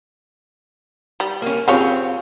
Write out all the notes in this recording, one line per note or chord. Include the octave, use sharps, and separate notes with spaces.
G3
A#3 C#4
C4 F4 G4 G#4 C#5